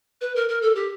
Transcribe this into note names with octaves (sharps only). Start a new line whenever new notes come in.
B4
A#4
A#4
A4
G4